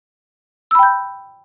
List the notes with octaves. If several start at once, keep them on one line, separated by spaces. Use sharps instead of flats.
G5 B5 E6 G6